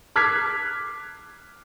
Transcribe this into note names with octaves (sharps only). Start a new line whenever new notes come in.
D6 F6 F#6 G#6 B6 C7